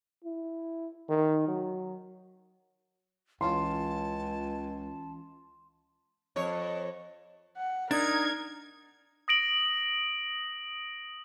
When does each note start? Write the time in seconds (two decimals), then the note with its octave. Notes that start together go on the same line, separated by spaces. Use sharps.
0.24 E4
1.09 D#3
1.48 F#3
3.41 C#2 E3 C#4 F4 A5 C6
6.36 F2 C#5
7.57 F#5
7.91 D4 D#4 A#4 G#6
9.28 D#6 A#6 D7 F#7